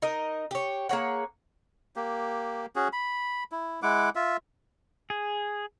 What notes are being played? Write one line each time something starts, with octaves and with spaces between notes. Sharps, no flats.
D#4 A#4 D#5
G4 C#5
A#3 G#4 C#5 F#5
A#3 G4
C#4 F#4 G#4
B5
E4
G#3 E4 F#5 D6
F4 E5
G#4